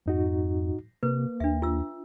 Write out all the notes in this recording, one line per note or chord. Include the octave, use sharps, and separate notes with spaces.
F2 G#2 D#4 F#4
C3 A#3 B4
D#2 D4 E5
F4 E6